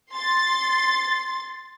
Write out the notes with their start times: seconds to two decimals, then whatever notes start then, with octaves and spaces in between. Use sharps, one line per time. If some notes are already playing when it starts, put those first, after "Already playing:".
0.12 C6 A6